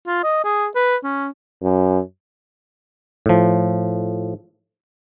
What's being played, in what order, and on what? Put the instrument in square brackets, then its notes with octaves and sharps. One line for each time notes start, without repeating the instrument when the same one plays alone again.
[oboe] F4
D#5
G#4
B4
C#4
[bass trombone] F#2
[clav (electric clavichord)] A2 F3